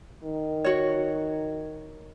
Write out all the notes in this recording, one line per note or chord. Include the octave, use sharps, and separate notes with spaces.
D#3
F#4 C#5